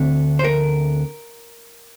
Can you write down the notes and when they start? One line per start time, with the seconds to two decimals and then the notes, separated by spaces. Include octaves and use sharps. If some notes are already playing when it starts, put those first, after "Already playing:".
Already playing: D2 D3 A3 C4
0.39 C5
0.44 A#4